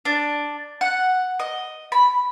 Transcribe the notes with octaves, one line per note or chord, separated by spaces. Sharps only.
D4
F#5
D#5
B5